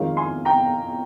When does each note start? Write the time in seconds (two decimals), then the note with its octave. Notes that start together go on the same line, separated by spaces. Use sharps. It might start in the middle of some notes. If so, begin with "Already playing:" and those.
Already playing: F2 D#3 G#3 C#5 F5
0.17 G#5 C6
0.45 G5 A#5